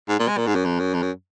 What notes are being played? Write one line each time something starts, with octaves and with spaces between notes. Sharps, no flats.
G#2
A#2
G#3
A#2
G#2
F#2
F2
F#2
F2
F#2